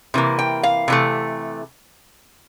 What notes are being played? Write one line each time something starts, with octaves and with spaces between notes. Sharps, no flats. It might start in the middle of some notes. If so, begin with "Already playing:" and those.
C3 E3 A#3
G5
F5
C3 E3 A3